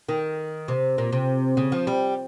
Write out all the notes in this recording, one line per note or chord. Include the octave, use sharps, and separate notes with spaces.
D#3
C3
A#2
C3
C#3
F3
G3